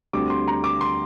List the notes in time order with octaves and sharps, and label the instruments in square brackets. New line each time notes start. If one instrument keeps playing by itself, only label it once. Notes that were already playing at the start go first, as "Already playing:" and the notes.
[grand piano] D2 D3 G3 C4 D6
C6
A#5
D6
C6